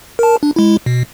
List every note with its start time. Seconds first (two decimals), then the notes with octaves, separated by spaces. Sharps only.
0.19 A#4 A5
0.43 D4
0.56 G#3 E4
0.86 B2